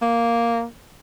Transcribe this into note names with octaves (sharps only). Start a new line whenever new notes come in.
A#3